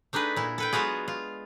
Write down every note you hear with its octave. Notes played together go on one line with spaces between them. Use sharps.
A3 D4 D#4 G#4 B4
A#2 E4
A4 B4 G5
F#3 G#3 B3 F4 F#4 G#4
F4